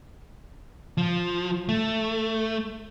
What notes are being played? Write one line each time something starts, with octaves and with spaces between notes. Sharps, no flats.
F3
A3